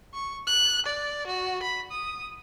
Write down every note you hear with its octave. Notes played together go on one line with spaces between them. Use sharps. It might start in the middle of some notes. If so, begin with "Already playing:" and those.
C#6
F#6
D5
F#4
B5
D#6